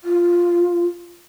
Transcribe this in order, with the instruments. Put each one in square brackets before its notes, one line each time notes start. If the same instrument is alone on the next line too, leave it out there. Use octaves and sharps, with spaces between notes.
[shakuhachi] F4